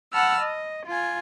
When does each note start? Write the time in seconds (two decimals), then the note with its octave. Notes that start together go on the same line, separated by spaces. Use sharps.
0.13 F#5 A5 B5 E6 F6
0.41 D#5
0.87 F4 G#5